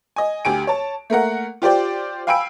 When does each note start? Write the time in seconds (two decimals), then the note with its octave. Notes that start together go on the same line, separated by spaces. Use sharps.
0.16 D#5 G#5
0.45 D2 G4 G#5 D7
0.67 C#5 A5
1.10 A3 A#3 A#4 F#5
1.62 F4 G4 C5 D5 G5
2.27 F5 G5 G#5 B5 E6 D7